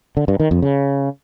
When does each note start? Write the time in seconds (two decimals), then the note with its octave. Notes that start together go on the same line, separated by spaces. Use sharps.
0.17 D3
0.28 G2
0.40 D#3
0.51 F2
0.62 C#3